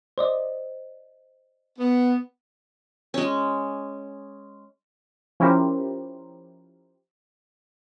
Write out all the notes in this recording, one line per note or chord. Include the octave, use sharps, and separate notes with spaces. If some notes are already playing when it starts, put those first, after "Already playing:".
C5 D5 D#5
B3
G#3 C#4
F3 C#4 E4 G4 A#4 C5